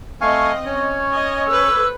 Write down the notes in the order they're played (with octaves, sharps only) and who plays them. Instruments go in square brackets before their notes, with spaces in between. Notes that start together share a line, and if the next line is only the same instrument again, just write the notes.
[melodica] A3 G#5 C#6 [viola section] C4 D#5 [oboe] F5
[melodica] C#4 [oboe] C#5
[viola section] D#5 G#5
[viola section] A4 B4 C5 [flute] E6